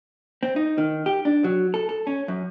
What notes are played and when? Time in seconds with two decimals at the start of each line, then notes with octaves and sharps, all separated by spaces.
0.43 C4
0.56 D#4
0.78 D#3
1.06 G4
1.25 D4
1.44 F#3
1.74 A4
1.89 A4
2.07 C#4
2.28 F#2